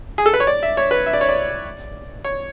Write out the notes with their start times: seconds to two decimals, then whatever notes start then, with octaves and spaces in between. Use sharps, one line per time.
0.18 G#4
0.26 A4
0.34 B4
0.40 C#5
0.47 D5
0.63 E5
0.77 C#5
0.91 B4
1.06 E5
1.13 D5
1.21 C#5
1.29 D5
2.24 C#5